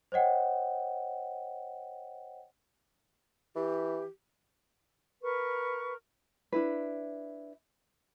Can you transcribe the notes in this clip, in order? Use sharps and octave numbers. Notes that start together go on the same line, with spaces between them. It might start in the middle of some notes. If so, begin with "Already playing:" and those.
C5 C#5 D#5 F#5 G5
E3 G4
A#4 B4 C#6
D4 E4 B4